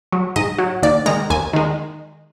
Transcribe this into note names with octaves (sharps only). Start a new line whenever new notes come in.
F#3
G#2 D#5
F#3
D#2 D5
D#3 G#3 A#5
D#2 G#5
D#3 G#3